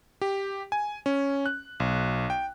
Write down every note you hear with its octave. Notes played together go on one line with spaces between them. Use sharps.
G4
G#5
C#4
F#6
B1
G5